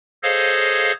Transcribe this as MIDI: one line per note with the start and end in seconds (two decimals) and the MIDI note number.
0.23 0.92 68
0.23 0.92 69
0.23 0.92 72
0.23 0.92 73
0.23 0.92 75
0.23 0.92 77